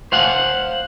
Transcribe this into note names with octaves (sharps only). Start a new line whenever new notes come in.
C5 F5 F#5